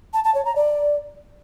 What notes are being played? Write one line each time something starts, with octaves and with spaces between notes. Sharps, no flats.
A5
A5
C#5
A#5
D5